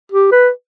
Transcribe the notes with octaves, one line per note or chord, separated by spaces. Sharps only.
G4
B4